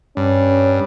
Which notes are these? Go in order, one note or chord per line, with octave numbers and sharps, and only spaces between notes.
G2 C#4